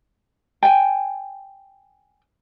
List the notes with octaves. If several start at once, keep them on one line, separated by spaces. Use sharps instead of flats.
G5 G#5